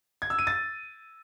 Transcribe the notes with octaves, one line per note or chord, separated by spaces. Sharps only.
G#6
E6
D#7
A6